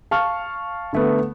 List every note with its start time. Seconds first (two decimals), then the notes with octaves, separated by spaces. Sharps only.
0.11 F5 A5 C#6 F6
0.93 D3 A3 B3